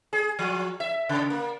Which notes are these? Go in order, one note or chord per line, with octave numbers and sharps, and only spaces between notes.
G#4
F3
E5
C#3
A#3